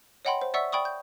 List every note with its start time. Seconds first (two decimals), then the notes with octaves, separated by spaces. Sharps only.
0.25 C#5 D#5 F#5 G5 B5 C6
0.41 C5
0.54 D5 E5 F#5 C#6 E6 B6
0.72 D5 G5 B5 C#6 D#6
0.85 G6